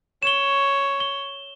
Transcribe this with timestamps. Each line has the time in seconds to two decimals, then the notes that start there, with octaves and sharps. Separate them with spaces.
0.23 C#5 E7 G7
1.00 G7